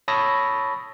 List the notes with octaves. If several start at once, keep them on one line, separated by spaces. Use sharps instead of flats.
C#5 A5 B5 D#6 E6 A#6